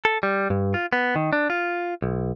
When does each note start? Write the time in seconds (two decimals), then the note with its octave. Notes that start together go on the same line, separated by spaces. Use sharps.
0.05 A4
0.23 G3
0.50 G2
0.74 F4
0.93 B3
1.16 D#3
1.33 D4
1.50 F4
2.02 B1